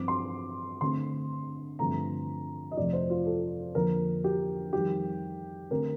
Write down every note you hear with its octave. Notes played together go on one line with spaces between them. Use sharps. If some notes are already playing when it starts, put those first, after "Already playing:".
Already playing: G2 F3 C4 D6
C6
D3 A3 C4 C6
G2 D3 F3 A3 C4 A#5
D#5
F2 C3 F3 A3 D5
C5
F4
A4
F2 D3 F3 A#3 A#4
G4
F2 D#3 G3 G4
D3 A3 C4 A#4